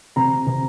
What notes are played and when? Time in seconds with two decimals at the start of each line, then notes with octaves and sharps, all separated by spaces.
0.16 C3 A#5
0.47 C3